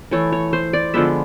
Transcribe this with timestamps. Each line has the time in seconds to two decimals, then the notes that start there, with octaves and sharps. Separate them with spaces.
0.11 E3 A3 C#5
0.32 C#5
0.53 C5
0.73 D5
0.94 D3 F3 G#3 B3 E5